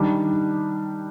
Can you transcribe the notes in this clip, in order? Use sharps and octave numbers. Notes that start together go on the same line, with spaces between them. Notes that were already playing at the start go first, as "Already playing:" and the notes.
Already playing: D#3 G3 D4